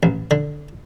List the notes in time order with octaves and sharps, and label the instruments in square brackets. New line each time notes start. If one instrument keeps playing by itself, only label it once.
[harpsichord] A1
D3